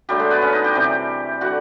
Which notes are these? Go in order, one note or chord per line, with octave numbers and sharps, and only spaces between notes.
D3 F#3 G3 A3 G4
G#3 G#4
B3 B4
C#4 C#5
D#4 D#5
G4 G5
C3 E3 G3
D3 G3 F#4 F#5